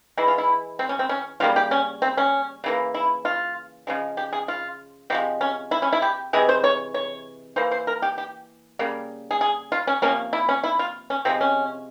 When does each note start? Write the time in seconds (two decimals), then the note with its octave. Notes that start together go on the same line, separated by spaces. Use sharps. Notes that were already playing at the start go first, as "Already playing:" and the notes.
0.17 E3 G#3 E4
0.28 F4
0.38 E4
0.79 C4
0.89 C#4
0.99 C4
1.09 C#4
1.40 C#3 G3 A#3 F4
1.56 G4
1.71 C#4
2.02 C4
2.17 C#4
2.64 C#3 E3 A#3
2.94 E4
3.25 F4
3.87 C#3 F3 G#3
4.17 G4
4.32 G#4
4.48 F4
5.10 C3 F3 G#3 G4
5.41 C#4
5.71 E4
5.82 C#4
5.93 E4
6.02 G4
6.33 C3 E3 G#3 G#4
6.49 C5
6.64 C#5
6.94 C#5
7.56 E3 A#3 C5
7.71 C5
7.87 A#4
8.02 G4
8.18 G4
8.79 C#3 G3 A#3
9.31 G#4
9.41 G#4
9.72 F4
9.87 C#4
10.02 C3 F3 A#3 C#4
10.33 E4
10.49 C#4
10.64 E4
10.79 F4
11.10 C#4
11.25 C3 F3 G#3 C4
11.41 C#4